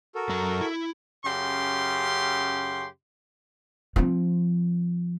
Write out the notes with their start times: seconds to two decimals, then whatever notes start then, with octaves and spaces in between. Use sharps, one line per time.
0.15 F#4 A4 A#4
0.29 F#2 F#3 A#5
0.61 E4
1.25 F#2 C#3 G4 C6
3.96 F3 C4